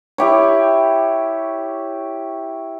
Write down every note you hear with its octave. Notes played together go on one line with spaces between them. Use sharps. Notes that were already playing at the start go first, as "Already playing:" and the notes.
E4 G4 C#5